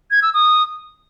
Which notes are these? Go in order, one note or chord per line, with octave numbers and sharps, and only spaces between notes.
G#6
E6
D#6